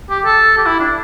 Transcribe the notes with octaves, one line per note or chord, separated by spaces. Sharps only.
G4
A4
G4
E4
D4